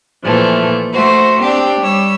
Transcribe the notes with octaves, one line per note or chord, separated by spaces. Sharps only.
A#2 E3 F3 A3
A3 F#4 C5
C4 D4 G4
G3 C#5 E6